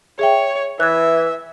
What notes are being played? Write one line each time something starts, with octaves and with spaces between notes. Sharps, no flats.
G#4 C#5 E5 G5
E3 E5 F#6 G#6